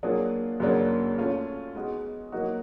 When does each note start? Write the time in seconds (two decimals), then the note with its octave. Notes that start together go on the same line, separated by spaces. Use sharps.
0.03 F#3 A#3 D4 F4 G#4
0.60 F#2 C#3 F#3 A#3 D4
1.18 A3 C#4 F4
1.75 G#3 B3 D#4 F#4
2.32 F#3 A#3 D#4 F#4